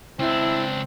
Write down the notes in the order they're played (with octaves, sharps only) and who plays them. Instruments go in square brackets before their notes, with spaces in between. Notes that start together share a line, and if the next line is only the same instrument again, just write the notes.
[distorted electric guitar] C#2 D4 [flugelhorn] C4 [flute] E4